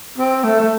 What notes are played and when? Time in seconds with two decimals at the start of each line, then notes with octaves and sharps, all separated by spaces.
0.18 C4
0.44 A3
0.60 A3